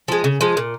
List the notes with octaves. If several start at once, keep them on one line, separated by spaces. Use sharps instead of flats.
F3 G#3
C#3
F3 G#3
A#2